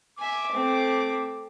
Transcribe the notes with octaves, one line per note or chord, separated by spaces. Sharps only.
E5 G#5 D6
A3 C4